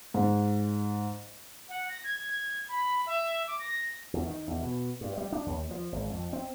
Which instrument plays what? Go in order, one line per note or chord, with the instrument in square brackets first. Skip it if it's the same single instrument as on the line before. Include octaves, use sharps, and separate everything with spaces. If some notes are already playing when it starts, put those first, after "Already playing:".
[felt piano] G#2
[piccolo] F#5
A#6
G#6
B5
E5
D6
A#6
[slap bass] E2
D#3
E2
B2
G2
G3
D4
D#2
F3
G#1
F2
C4